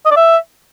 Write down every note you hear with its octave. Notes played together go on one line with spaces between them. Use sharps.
D#5
D5
E5